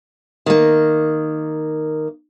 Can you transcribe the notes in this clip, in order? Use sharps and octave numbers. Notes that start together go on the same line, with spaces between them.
D#3 A#3